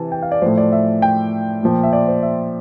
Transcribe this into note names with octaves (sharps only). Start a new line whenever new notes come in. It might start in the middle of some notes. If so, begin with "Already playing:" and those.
Already playing: C3 E3 A5
G5
F5
D5
A2 F3 C5
D5
E5
G5
A#2 F3
E5
D5
C5
E5